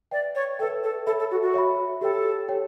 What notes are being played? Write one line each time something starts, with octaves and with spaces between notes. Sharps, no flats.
B4 D5 E5 G5
C#5
A4 B4 E5 G5
A4
A4 C#5 E5 B5
A4
F#4
F#4
C#5 E5 B5
G4 A4 C#5 G5
G4 C#5 G5